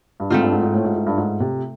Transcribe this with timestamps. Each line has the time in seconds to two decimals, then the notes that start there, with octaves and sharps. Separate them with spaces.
0.20 G2
0.30 G#2 A3 C4 F4
0.41 G2
0.52 G#2
0.63 G#2
0.74 A2
0.85 G#2
0.96 G#2
1.07 G2
1.18 G#2
1.40 C3